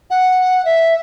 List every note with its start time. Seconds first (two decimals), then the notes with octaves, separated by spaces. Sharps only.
0.10 F#5
0.65 E5